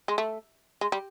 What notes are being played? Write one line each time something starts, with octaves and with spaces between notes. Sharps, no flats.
G#3
A3
G#3
G3